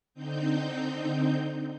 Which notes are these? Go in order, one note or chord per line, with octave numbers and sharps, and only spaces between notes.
D3 C4 D#4 G6